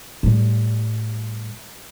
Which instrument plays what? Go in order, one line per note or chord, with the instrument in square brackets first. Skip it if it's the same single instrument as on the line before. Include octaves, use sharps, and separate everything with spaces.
[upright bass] A2 G3